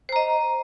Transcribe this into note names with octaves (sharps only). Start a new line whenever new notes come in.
C5 D#5 A#5